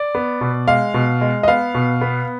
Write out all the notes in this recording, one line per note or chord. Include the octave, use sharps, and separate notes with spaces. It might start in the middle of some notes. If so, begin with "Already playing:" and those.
Already playing: D5
B3
B2
G#3 F5
B2
G#3
D#5
B3 F5
B2
B3